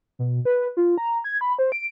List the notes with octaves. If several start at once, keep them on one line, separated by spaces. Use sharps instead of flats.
B2
B4
F4
A#5
G#6
B5
C5
D7